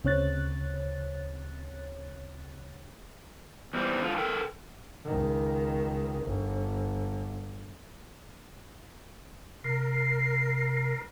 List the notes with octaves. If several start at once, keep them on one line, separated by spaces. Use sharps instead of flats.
D2 C#3 C4 C#5 F#6 A6
E2 E3 G3 C4
D3 F4
A4 A#4 G5
C#2 D#3
G1
C3 A#4 C7